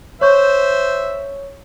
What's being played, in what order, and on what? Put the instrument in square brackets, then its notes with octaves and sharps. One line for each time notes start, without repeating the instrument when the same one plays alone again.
[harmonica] C5 E5 [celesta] C#5 C#6 G6